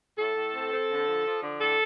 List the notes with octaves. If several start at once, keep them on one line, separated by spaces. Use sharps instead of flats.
A2 A4
A2
C4
C4
D3
F3
F3
D3
A2 A4